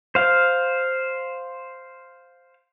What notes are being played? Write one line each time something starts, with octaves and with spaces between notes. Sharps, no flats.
C5 F5